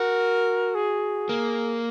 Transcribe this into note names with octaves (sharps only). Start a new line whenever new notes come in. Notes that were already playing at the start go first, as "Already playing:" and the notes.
Already playing: F#4 A#4
G#4
A#3